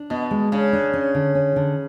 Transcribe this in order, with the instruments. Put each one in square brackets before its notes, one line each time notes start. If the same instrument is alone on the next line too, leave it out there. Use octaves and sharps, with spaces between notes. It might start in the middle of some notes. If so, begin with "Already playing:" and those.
Already playing: [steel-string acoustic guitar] D4
[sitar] B2 [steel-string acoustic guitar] B3
[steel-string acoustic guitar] G#3
[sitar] C#3 [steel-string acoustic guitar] D4
[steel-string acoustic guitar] D4
C#4
D3
C#4
D3